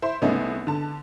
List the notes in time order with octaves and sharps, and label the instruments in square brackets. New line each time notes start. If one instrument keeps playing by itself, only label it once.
[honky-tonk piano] E4 C5 C6
[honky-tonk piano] C2 G#3 A3 [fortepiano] B3 C#4 D#4
[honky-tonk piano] D3 A5